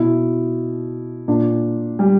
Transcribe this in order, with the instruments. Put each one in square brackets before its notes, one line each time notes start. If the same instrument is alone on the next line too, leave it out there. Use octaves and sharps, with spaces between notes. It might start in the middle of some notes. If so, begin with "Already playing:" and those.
Already playing: [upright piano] B2 E4
A#2 D4
G3